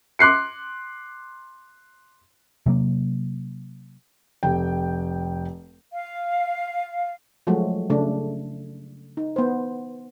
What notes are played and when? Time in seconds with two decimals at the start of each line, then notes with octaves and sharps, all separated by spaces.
0.19 C6 D6 F#6 C7 C#7
2.66 C3 F#3 A#3
4.43 F1 G5
5.92 F5
7.47 F3 F#3 G#3 A3 F#4
7.90 C#3 A3 D4
9.17 D#4
9.36 B3 C5